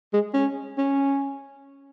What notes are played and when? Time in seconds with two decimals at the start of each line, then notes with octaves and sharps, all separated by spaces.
0.13 G#3
0.34 C#4
0.78 C#4